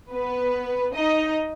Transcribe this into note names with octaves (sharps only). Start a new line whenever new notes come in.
B3 B4
D#4 D#5